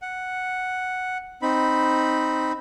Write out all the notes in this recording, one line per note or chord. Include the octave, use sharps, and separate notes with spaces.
F#5
C4 D#4 B5